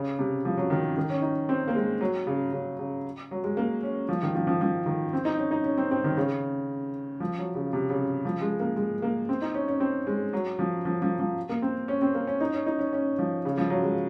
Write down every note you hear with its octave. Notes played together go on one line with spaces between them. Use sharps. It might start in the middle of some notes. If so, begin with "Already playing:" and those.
Already playing: C#3
C3
F3
F#3
D#3
D#3
C#4
D#4
C4
A#3
G#3
F#3
C#3
C#3
C#3
F#3
G#3
A#3
C#4
F3
D#3
F3
F3
F3
D#3
C4
D#4
C#4
D#4
C#4
C4
C4
D#3
C#3
F3
F#3
C#3
C3
C#3
F3
G#3
A#3
G#3
A#3
C4
D#4
C#4
C#4
C4
G#3
F#3
F3
F3
F3
F3
A#3
C4
C#4
C4
A#3
C#4
D#4
C#4
D#4
C#4
C#4
F3
C#3
F3
F#3
G#3